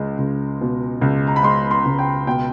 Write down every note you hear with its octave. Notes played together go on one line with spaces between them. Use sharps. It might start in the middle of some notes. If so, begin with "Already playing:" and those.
Already playing: C#2 G#3
C#2
B2
C#2
A#5
B5
G#3 C6
C6
C#2
G5
B2 G5